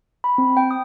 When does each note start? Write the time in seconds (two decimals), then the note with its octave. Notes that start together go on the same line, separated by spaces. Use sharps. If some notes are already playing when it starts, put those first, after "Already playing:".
0.24 B5
0.38 C4
0.57 G5
0.71 D#6